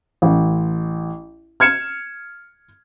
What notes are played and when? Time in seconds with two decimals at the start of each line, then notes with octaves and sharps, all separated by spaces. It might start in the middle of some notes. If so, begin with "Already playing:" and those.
0.22 A1
1.60 F6 G#6 C#7 E7